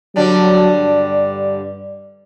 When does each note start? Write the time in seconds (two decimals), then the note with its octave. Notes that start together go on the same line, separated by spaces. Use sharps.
0.16 D3 F#3 G3 D4
0.77 G2 D5